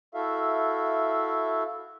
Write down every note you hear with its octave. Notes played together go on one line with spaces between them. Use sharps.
E4 F#4 A4 E5 F5